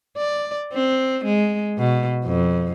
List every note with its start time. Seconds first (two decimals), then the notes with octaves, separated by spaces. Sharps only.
0.17 D5
0.73 C4
1.25 G#3
1.78 B2
2.25 F2